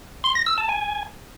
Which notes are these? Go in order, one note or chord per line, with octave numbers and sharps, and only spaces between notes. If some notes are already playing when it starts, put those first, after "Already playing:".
C6
A#6
E6
A5
G#5